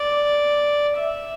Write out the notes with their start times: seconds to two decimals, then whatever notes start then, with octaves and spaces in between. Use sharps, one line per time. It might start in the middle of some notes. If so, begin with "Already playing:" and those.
Already playing: D5
0.96 E5